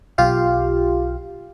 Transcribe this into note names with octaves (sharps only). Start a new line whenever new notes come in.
B1 F4 G4 F5